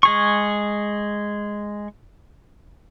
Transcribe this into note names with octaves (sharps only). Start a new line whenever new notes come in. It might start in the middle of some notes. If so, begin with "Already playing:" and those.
G#3 G#4 C#6